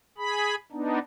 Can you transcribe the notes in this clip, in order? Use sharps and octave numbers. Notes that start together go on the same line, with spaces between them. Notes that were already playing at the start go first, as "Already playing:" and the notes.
G#4 B5
B3 D4 D#4